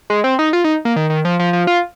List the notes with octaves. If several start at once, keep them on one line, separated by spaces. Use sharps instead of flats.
G#3
C4
D#4
F4
D#4
A#3
D#3
D#3
F3
F3
F3
F4